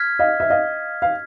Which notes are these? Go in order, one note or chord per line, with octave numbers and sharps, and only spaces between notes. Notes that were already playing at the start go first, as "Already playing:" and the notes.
Already playing: F6 G#6 B6
D#5 F5
E5
D#5 F5
F5